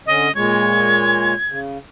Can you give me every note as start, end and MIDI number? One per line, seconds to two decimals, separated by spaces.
0.06 0.28 50
0.06 0.28 61
0.06 0.34 75
0.35 1.34 46
0.35 1.34 56
0.35 1.34 73
0.35 1.58 92
1.48 1.78 49